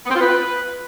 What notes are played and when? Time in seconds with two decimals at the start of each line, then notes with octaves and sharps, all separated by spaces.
0.05 B3
0.10 C4
0.15 F4
0.21 B4